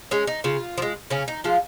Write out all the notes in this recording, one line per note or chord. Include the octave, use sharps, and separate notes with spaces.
G#3 C#4
D#4
C#3 F4
F3
G#3
C#3 C#4
D#4
F3 G#3 F4